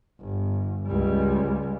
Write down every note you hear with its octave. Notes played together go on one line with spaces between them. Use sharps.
G1
C#2 G3